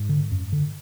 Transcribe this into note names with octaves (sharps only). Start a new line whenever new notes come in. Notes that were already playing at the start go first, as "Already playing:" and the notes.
Already playing: G#2 G#3
D3
F#2
D3